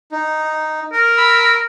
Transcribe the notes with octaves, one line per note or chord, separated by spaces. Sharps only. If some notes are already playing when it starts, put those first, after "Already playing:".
D#4
A#4
B5 E6